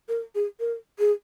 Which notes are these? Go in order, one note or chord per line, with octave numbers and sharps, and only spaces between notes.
A#4
G#4
A#4
G#4